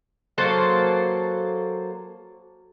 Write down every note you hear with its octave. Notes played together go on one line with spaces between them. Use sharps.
F#3 A#3 A4 C5